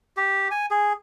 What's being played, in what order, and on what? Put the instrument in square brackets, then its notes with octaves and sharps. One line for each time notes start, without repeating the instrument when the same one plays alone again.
[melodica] G4
G#5
G#4